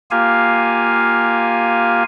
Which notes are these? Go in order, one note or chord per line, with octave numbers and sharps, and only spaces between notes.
A#3 F4 G4 F5 G#5